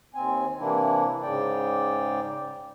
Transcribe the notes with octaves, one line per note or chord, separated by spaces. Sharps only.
D#2 C4 G#5
C3 E3 A#3 D4 E4
G#2 C#3 D5 G5